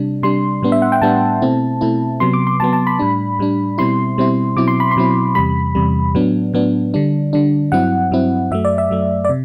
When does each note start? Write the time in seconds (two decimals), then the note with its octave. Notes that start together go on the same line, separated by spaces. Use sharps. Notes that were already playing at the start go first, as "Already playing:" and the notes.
Already playing: C3 G3 D4
0.23 C3 G3 D4 C6
0.62 A2 G3 B3 D4
0.72 E5
0.82 F#5
0.92 G5
1.02 A2 G3 B3 D4 A5
1.42 B2 A3 C4 E4
1.81 B2 A3 C4 E4
2.20 C3 F#3 B3 C6
2.34 D6
2.47 C6
2.60 C3 F#3 B3 A5
2.73 A5
2.87 B5
2.99 A2 G3 D4
3.39 A2 G3 D4
3.78 B2 G3 C4 E4 C6
4.18 B2 G3 C4 E4
4.57 B2 F#3 C4 E4 D6
4.68 C6
4.80 B5
4.91 C6
4.97 B2 F#3 C4 E4
5.35 E2 C3 G3 B5
5.75 E2 C3 G3
6.15 A2 F#3 B3 D4
6.54 A2 F#3 B3 D4
6.94 D3 G3 D4
7.33 D3 G3 D4
7.72 G2 F#3 C4 E4 F#5
8.11 G2 F#3 C4 E4
8.51 F#2 F#3 A3 E5
8.65 D5
8.78 E5
8.90 F#2 F#3 A3
9.25 D5
9.29 C3